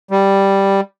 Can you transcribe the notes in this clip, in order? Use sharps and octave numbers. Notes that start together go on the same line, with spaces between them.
G3